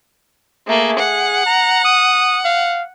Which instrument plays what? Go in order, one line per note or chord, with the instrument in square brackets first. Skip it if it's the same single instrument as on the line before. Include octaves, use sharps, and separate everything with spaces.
[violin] A3 A#3 [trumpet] G#4
[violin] F#5
[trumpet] A#5
D#6
F5